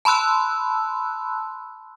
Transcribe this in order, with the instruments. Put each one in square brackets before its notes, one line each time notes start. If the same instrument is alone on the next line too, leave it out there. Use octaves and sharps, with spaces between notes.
[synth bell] A5 B5 C6 E6 F#6